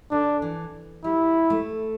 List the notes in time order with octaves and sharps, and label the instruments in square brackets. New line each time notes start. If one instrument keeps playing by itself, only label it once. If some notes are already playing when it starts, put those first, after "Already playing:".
[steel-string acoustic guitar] D3 [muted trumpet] D4
[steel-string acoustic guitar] E3
[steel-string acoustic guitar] G3 [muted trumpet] E4
[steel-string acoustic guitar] A3